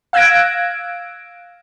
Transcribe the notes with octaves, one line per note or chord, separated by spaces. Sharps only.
F5 E6 F#6 G#6 A#6 D7